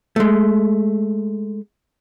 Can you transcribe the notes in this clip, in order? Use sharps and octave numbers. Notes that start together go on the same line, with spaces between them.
G#3 A3